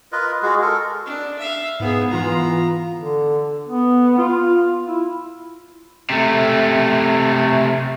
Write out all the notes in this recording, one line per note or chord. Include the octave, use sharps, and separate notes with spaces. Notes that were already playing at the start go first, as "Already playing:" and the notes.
F4 A#4 B4 D#5
G#3 F#4 G#4
A4 A#4
D4
E5 F5
G#2 B3 G#4
E3 B3 F4 F5 A#5
D3
B3
F4
E4
C3 A3